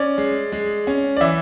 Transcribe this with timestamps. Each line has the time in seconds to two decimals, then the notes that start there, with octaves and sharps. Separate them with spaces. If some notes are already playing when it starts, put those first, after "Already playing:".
Already playing: C#4 D5
0.18 G#3
0.52 G#3
0.87 C#4
1.17 D5
1.21 E3 E5